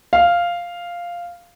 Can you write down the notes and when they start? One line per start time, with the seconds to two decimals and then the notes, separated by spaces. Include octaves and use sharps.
0.13 F5